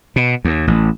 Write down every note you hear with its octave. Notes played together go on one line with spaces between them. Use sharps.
B2
D#2
A1